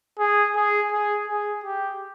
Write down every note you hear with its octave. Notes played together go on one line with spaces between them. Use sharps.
G#4
G#4
G#4
G#4
G4